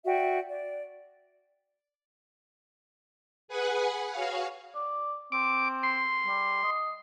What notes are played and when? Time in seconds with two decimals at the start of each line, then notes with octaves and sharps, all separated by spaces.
0.05 F#4 D5 E5 G5
0.49 D5
3.48 G#4 B4 F#5 G#5
4.11 F#4 C#5 F5
4.75 D5
5.32 C4 D6
5.83 C6
6.26 G3
6.63 D#5